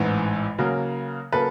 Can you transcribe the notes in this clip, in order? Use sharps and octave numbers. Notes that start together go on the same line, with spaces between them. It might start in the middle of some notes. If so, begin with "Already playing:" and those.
Already playing: A1 G#2 E3 B4
C#3 F#3 A#3
C#3 F#3 A#3 A4 B4